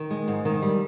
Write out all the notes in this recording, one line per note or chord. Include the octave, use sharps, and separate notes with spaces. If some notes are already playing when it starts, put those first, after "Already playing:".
Already playing: D#3
G#3
G#2
D#3
G3